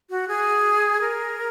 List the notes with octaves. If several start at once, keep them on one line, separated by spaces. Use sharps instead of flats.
F#4
G#4
A#4